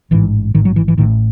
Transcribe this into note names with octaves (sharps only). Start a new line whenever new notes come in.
A1 G#2 E3
A1 G#2 D#3
F#3
E3
E3
A1 A2 D#3